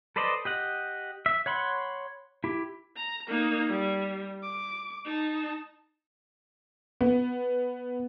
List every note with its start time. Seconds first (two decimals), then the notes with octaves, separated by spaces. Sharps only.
0.16 A4 B4 C5 D5 D#5
0.45 G4 D#5 F#5
1.26 E5
1.46 C#5 F#5 B5 C6
2.44 E4 G4
2.96 A#5
3.28 A#3 D#4
3.67 G3
4.43 D6
5.05 D#4 A5
7.01 B3